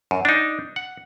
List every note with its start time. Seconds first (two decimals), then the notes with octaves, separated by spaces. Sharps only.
0.11 F#2
0.25 D4 D#4
0.76 F#5